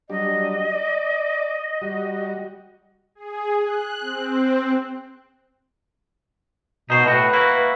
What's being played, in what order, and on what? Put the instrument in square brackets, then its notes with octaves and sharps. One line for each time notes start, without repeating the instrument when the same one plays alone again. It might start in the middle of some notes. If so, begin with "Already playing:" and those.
[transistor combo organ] F#3 G3 D4 [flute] D#5
[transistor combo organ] D5
G3 F#4
[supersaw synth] G#4
F#6
C4
[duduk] B2 [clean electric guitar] D#4 C5
[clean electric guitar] A2 F#4 [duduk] B4
[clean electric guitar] A#3 E4 F#4